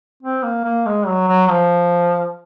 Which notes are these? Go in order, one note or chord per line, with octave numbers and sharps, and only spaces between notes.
C4
A#3
A#3
G#3
F#3
F#3
F3